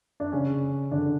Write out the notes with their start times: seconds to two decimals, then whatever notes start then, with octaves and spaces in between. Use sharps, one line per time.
0.20 D4
0.32 C#3 C#4
0.91 D3 D4